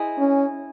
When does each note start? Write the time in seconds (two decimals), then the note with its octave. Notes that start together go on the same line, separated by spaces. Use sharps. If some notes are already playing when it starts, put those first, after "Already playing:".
Already playing: E4 G#4 C5 D#5
0.19 C#4